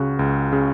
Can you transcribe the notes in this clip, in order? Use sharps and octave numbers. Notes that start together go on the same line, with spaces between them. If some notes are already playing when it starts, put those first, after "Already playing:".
Already playing: C#2 C#3 F#4
C#2
C#3